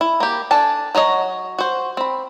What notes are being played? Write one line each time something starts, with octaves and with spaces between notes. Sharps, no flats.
E4
A#3 G4
D4 A4 G#5 A5
F#3 F#4 C#5 D#5
F#4 C5
C4 B5